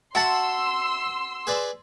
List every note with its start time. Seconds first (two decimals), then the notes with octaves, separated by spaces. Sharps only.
0.15 F#4 E5 F#5 A5 B5 C6 E6
1.47 G#4 B4 D5